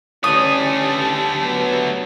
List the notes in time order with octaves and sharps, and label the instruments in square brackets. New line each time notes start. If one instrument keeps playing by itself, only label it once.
[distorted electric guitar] D3 A3 [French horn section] E3 G3 C#4 [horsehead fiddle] G4 A5 [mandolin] D#6
[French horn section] F#3 B3